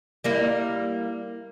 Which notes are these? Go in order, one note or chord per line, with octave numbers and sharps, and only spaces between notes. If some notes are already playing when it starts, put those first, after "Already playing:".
G3 A#3 E4